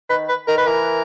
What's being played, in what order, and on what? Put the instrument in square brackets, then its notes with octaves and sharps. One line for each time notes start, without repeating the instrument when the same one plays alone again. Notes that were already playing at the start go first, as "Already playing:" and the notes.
[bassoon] D#3 [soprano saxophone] B4
[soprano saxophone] B4
[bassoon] D#3 [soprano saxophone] A#4
[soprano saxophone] B4
[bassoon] E3 [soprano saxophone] A#4